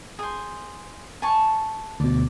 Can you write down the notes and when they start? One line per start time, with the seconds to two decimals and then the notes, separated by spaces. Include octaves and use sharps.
0.19 G#4 C5
1.22 G#5 A5 C#6
2.00 D2 B2 D5